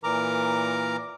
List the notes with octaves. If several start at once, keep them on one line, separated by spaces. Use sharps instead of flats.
A#2 E3 A#4 A#5 D6